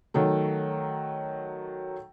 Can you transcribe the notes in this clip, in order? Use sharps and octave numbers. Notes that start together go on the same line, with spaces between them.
D#3 F#3 A3